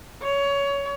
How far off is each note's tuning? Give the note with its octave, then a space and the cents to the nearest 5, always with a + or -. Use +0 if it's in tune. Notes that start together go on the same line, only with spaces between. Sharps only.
C#5 +20